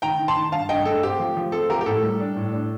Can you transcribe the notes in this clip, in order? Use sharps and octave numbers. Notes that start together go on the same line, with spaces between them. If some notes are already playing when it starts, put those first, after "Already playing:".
D#3 G5 A#5
D#3
A5 C6
D#3
G2 F5 A5
G2 D#5 G5
G2 A4
C4 G4
F3
F3
C4 A4
F3 G4 A#4
G4
A2 A4
G3
D4
A2
D4